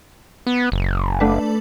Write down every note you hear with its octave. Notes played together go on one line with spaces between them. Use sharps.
B3
F#1
A3 D4 B4